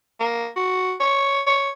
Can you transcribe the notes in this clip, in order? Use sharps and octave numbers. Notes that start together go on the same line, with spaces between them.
A#3
F#4
C#5
C#5